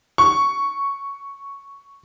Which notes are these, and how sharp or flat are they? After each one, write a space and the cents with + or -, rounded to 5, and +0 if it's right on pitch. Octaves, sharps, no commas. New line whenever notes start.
C#6 +0